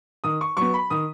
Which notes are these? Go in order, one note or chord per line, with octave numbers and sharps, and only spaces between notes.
D#3 D#6
C#6
F#3 B3 C#6
B5
D#3 D#6